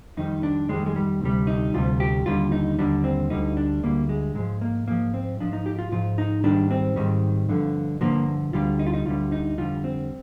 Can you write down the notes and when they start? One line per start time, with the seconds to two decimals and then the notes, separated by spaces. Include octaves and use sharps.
0.17 F2 D#3 G3 D#4
0.43 D4
0.69 F2 D#3 G3 G#3
0.86 G#3
0.96 G3
1.21 D2 C3 G3
1.47 D#4
1.74 D2 C3 G3 F4
2.00 G4
2.26 D#2 D3 G3 F4
2.52 D#4
2.79 D#2 D3 G3 D4
3.04 C4
3.30 D2 D3 G3 D#4
3.57 D4
3.83 D2 D3 G3 A#3
4.09 G#3
4.35 G#2 F3 G#3
4.61 A#3
4.88 G#2 F3 A#3
5.14 C4
5.40 G#2 F3 D4
5.53 D#4
5.66 G4
5.79 F4
5.92 G#2 F3 F4
6.18 D#4
6.44 G#2 D#3 G3 D4
6.71 C4
6.96 G#2 D#3 G3
7.49 G2 D3 F3
8.01 G2 D3 F3 A#3
8.53 D2 D3 G3 F4
8.79 D#4
8.87 F4
8.94 D#4
9.06 D2 D3 G3 F4
9.32 D#4
9.58 F2 D3 G3 F4
9.84 C4